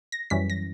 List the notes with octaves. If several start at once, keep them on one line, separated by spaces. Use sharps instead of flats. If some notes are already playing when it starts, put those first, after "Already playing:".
A#6
F#2 E3 G3 C#4 B6
A#6